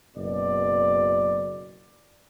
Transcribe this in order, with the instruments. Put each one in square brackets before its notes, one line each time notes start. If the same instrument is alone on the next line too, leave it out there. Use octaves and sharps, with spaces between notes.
[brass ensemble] F#1 B2 D5